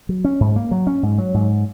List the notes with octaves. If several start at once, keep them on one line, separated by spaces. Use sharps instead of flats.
F#3
C#4
G#2
A#3
F#3
C#4
G#2
F#3
G#2